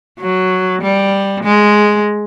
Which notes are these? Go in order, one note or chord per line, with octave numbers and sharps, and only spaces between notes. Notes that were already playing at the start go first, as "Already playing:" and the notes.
F#3
G3
G#3